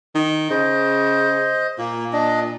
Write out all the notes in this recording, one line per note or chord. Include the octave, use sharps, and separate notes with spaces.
D#3
C#3 C5 D#5
A#2 A#3
D4 D#5